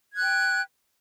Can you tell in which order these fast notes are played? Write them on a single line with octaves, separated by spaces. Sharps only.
G#6 F#6 G5